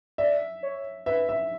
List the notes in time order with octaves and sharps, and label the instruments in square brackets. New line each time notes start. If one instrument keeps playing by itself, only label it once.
[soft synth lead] D5 [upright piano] E5
[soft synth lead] C#5
[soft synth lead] B4 [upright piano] E5
[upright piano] E5